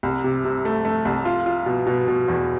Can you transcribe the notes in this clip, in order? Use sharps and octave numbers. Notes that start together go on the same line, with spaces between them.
C2
C3
C3
A3
A3
C2
F4
F4
B2
B2
B2
E2